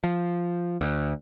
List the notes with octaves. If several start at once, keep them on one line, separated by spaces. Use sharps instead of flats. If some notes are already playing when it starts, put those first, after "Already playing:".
F3
D2